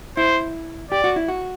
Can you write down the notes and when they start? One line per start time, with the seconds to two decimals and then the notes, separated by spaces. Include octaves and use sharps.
0.17 E4 C5
0.91 G4 D5
1.04 F#4
1.16 E4
1.28 F#4